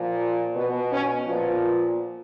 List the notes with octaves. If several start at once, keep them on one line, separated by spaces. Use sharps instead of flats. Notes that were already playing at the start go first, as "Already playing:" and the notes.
Already playing: A#2 F3
B2 B3
C#4
A#2 F3 B3